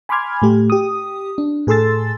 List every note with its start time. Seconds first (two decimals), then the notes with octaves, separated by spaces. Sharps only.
0.09 G#5 B5 C6 D6 F6 G#6
0.42 A2 A3 G4
0.70 G4 D#6
1.38 D4
1.67 A2 G#4 A4 C6 E6 A6